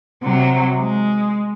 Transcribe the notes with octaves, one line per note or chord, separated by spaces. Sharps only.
C3 F#3
G#3